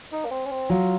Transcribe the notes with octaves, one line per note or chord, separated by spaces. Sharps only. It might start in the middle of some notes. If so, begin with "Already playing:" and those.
D#4
A#3
C4
C#4
C4
F#3 F4